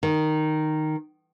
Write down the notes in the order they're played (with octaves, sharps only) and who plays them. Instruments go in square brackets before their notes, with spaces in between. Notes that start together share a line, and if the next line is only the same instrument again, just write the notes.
[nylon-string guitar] D#3